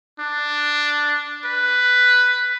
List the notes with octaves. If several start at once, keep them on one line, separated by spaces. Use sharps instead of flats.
D4
B4